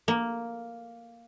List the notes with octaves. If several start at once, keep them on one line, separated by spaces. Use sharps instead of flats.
A#3